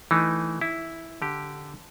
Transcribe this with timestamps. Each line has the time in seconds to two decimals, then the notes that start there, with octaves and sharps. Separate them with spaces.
0.11 E3 A3 D#4
0.61 E4
1.22 D3 G4